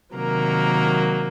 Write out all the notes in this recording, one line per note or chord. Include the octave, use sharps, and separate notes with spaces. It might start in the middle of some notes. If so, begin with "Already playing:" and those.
C3 D#3 F#3 A#3 A#4